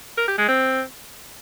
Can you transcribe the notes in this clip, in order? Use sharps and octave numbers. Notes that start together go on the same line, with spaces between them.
A#4
G4
G#3
C4